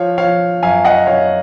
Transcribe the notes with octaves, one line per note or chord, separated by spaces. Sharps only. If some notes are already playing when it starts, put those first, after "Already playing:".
Already playing: F3 C#5 F5
F3 C#5 F5
F#2 F5 G#5
D#5 F#5
F#2 C#5 F5